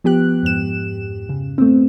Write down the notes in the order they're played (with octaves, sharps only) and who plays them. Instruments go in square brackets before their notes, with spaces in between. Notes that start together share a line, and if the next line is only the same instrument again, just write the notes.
[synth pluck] F3 B3 G4 F#6
F2 G#2 E7
C#3
A3 B3 C4